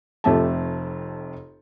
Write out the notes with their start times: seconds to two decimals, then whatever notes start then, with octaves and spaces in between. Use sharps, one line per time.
0.24 F1 F2 A3 G4 A5